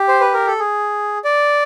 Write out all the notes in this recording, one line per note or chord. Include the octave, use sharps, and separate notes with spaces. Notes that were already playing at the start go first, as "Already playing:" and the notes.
Already playing: G4
C5
B4
A#4
A4
G#4
D5